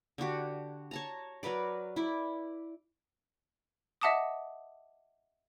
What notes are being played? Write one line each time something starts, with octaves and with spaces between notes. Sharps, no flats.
D3 D4 F#4 G4
C#5 A5 A#5
F#3 A#4 B4 D5
E4 D5
D#5 E5 F#5 A5 D6 D#6